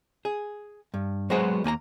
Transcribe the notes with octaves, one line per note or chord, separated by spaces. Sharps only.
G#4
G2
F#3 G#3 B3 F#4 G#4 C5
D#2 A#3 G#5 A#5